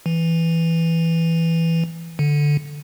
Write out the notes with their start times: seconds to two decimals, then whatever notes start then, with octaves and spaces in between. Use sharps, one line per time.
0.06 E3
2.19 D3